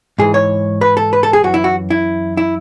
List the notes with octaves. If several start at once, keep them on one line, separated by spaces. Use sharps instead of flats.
G#2 E3 G#4
C#5
B4
A4
B4
A4
G#4
F#2 E3 F#4
E4
F#4
E4
E4